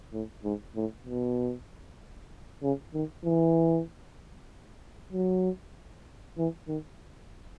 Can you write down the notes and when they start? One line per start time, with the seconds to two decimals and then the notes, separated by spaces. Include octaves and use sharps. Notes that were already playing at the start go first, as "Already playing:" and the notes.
0.13 A2
0.44 G#2
0.76 A2
1.06 B2
2.63 C#3
2.94 D#3
3.25 E3
5.12 F#3
6.38 E3
6.68 D#3